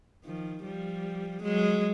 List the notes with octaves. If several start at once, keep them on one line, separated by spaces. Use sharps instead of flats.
D#3 F3
F3 G3
F#3 G#3